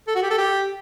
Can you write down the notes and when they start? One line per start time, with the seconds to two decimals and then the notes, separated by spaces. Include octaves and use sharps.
0.08 A4
0.15 F#4
0.23 G4
0.31 A4
0.38 G4